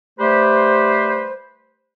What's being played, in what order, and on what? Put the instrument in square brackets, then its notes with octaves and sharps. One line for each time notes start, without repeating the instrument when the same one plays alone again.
[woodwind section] G3 A3 G4 B4 C5